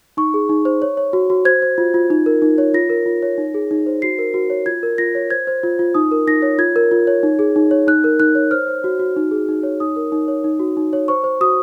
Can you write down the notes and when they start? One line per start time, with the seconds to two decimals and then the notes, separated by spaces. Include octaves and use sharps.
0.17 D#4 C#6
0.34 G#4
0.49 D#4
0.65 C5
0.82 C#5
0.97 C#5
1.13 F#4
1.30 F#4
1.45 C5 G#6
1.62 C5
1.78 F4
1.94 F4
2.10 D#4
2.26 A#4
2.42 D#4
2.58 C#5
2.74 F4 A#6
2.89 A#4
3.06 F4
3.23 C#5
3.38 D#4
3.54 G#4
3.71 D#4
3.86 C5
4.02 F#4 C7
4.19 A#4
4.34 F#4
4.50 C#5
4.66 F4 G#6
4.83 A#4
4.98 F4 A#6
5.15 C#5
5.30 C5 G#6
5.47 C5
5.63 F4
5.79 F4
5.94 D#4 D#6
6.12 A#4
6.27 D#4 A#6
6.42 C#5
6.58 F4 G#6
6.76 A#4
6.91 F4
7.07 C#5
7.23 D#4
7.39 G#4
7.56 D#4
7.71 C#5
7.87 D#4 F#6
8.04 A#4
8.20 D#4 F#6
8.35 C#5
8.51 C5 F6
8.68 C5
8.84 F#4
9.00 F#4
9.16 D#4
9.31 G#4
9.48 D#4
9.63 C#5
9.80 D#4 D#6
9.96 A#4
10.12 D#4
10.28 C#5
10.44 D#4
10.60 F#4
10.77 D#4
10.93 C#5
11.08 C5 C#6
11.24 C5
11.41 F#4 D#6